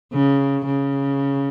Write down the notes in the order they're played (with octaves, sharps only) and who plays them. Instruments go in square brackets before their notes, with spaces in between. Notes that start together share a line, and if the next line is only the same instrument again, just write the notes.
[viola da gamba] C#3
C#3